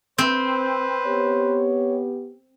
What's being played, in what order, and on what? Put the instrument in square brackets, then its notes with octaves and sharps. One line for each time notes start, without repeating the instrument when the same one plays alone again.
[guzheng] C4 [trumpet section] B4 C5
[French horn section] B3 G4 [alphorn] C#5